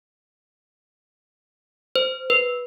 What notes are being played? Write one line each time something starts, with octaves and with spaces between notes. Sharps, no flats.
C5
B4